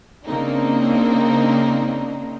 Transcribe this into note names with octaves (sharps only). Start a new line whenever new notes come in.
C#3 A#3 C4 D4 D#4